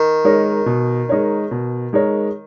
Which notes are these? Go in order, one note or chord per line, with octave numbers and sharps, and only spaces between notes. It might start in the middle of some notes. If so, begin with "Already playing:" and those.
Already playing: D#3
G#3 D#4 A#4 C#5
B2
G#3 D#4 A#4 C#5
B2
G#3 D#4 A#4 C#5